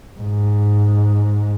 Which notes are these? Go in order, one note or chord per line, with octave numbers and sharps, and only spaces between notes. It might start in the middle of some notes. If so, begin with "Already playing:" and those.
G#2